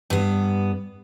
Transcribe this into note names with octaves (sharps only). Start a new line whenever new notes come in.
G2 B3